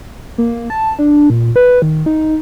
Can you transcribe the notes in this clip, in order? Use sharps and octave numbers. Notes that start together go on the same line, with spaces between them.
A#3
A5
D4
A#2
B4
D#3
D#4